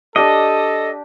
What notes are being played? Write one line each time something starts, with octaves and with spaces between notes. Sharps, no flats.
D4 G4 A4 D#5